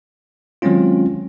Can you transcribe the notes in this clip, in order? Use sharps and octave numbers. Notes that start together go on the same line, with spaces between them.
D#3 F#3 G#3 C4 C#4 F4